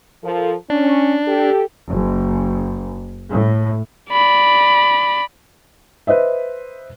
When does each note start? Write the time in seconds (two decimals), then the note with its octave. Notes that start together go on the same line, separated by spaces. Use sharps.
0.24 F3 A4 A#4
0.70 C#4 D4
1.27 G4 A4
1.91 F#1
3.30 A2
4.10 D5 B5
6.07 B4 C5 D#5 E5